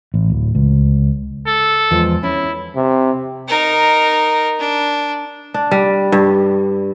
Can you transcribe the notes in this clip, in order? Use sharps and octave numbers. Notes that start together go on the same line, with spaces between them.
A1
D1
C#2
A4
E2 F3 G#3
C#4 E4
C3
D#4 A#4
D4
D4
G3
G2